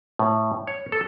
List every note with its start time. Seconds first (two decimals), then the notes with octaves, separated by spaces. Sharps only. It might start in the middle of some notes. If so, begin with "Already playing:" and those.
0.19 A2
0.67 C#5
0.92 A4